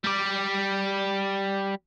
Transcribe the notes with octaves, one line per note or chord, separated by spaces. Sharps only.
G3 D5